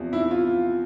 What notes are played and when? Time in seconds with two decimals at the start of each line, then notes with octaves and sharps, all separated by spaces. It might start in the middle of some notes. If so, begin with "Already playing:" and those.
Already playing: E2 C3 F3
0.13 E4
0.31 F4